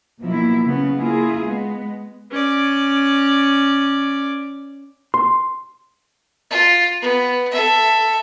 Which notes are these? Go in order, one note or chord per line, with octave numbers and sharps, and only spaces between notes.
B2 F3 F#3 A#3 E4
C#3 B3
A#3 E4 F4 G#4
G#3 B3
C#4 D5
C6
F4
B3
A4 E5